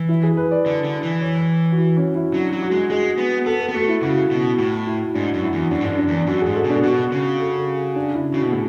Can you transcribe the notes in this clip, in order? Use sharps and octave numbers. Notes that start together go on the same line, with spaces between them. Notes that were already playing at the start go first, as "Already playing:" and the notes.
Already playing: E3
E4
G#4
B4
D5
D3
D3
E3
C#5
F#4
E4
C#4
E4
F#3 D4
F#3
F#4
G#3
G#3 G#4
B3
B3 A4
A4
B3
A3 F#4
E4
C#3 F#4
B2
A2 F#4
E4
G#2 D4
F#2
E4
E2
F#2 D4
G#2 D4
F#2
D4
E2
D4
F#2 F#4
G#2 G#4
A4
B2
D4
B2 F#4
C#3
A4
D4
E4
C#3 F#4
B2
A2 G#4